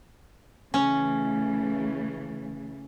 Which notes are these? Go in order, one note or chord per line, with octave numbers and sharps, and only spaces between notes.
C#3 E3 A3 C#4